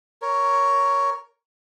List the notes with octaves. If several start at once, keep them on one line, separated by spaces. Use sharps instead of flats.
A#4 C#5